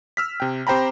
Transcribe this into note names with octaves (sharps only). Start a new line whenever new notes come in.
E6 F6 B6
C3 G5
C4 G4 C5 G5 A#5 B5